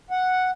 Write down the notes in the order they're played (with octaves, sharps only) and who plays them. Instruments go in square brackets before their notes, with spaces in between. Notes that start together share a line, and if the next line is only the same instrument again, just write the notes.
[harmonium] F#5